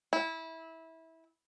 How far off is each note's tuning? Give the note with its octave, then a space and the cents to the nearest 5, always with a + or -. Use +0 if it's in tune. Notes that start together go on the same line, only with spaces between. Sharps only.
E4 -20